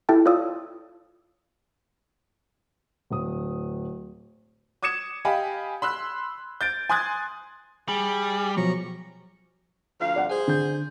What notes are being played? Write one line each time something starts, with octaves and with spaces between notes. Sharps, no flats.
E4 G4 A4 E5 G5 A5
F4 C#5 D5 F5 D#6 E6
D1 D#6
D6 D#6 G#6 C#7 E7
G4 D#5 F5 G#5 B5
B5 C6 E6 F#6
G6 A6 D7
G#5 C6 D#6 F#6 G#6 A6
G3 G#4
B2 F3 F#3 A#5 C#6
D2 F3 F5
D5 F#5
G#4 C5
D3 G6